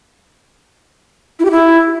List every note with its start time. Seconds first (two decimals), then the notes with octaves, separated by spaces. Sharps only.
1.39 E4
1.45 G4
1.51 E4